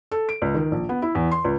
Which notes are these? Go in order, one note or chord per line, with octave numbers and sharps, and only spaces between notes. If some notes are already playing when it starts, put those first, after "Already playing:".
A4
D7
C#2
D#3
A#1
B3
E4
E2
C6
C#2